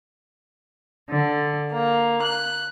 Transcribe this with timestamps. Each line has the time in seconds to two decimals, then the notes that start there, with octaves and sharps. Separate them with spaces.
1.10 D3
1.75 A#3
2.25 F#6